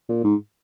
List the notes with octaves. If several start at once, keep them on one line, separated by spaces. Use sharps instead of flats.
A#2
G#2